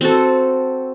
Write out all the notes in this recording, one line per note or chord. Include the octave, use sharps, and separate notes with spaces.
C4 F#4 A4